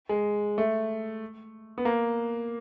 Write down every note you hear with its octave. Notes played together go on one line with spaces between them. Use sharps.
G#3
A3
B3
A#3